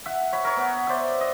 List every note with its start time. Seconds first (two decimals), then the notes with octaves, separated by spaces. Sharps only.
0.06 E5 F#5
0.32 C#5 B5
0.44 A#4 C#5
0.57 B3
0.87 C5 D5 E5
1.21 D#5